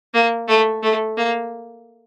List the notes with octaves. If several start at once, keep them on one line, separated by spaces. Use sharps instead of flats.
A#3
A3
A3
A#3